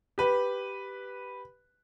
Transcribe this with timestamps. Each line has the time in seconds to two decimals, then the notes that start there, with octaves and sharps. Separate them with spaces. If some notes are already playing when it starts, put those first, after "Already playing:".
0.18 G4 B4